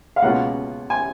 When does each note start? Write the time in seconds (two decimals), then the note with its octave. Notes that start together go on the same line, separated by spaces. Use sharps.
0.16 F5
0.22 C#2 B2 A#3 C#4 F4 F#5
0.90 G#5